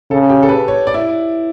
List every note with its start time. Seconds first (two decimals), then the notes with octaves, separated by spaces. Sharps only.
0.11 C#3 A4
0.30 G4
0.43 A4
0.49 B4
0.68 C#5
0.87 D5
0.94 E4